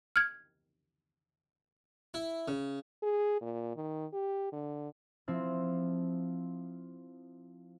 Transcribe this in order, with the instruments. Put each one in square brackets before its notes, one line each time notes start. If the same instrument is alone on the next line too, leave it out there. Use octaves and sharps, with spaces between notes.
[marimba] F6 G#6
[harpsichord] E4
C#3
[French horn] G#4
A#2
D#3
G4
D3
[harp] F3 C4 E4